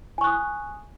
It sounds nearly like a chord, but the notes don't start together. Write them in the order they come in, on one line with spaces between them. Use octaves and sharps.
G#5 C#6 F#6 D#6